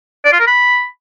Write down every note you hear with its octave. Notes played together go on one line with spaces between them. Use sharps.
D5
F4
A#4
B5